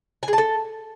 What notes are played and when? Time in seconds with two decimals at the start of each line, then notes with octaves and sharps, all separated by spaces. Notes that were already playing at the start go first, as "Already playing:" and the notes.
0.23 G#5
0.28 G#4
0.33 A5
0.38 A4